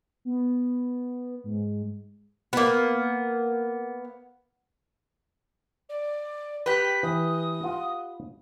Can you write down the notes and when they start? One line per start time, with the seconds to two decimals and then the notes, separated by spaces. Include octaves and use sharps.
0.25 B3
1.44 G#2
2.53 A#3 B3
5.89 D5
6.66 G4 B4 B6
7.03 E3 D#6
7.64 F4 F#5